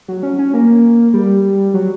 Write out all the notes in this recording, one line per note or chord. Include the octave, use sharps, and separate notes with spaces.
F#3
C#4
C#4
A#3
G3
F#3